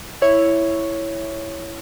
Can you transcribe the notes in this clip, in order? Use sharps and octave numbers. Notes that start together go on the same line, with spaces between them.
E4 C#5